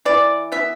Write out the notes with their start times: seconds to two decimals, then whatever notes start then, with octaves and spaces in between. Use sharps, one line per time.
0.05 E3 D5
0.52 B3 E5